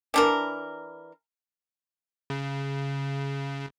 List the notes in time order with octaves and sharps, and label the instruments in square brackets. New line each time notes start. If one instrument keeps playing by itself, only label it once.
[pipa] E3 D4 A#4
[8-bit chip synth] C#3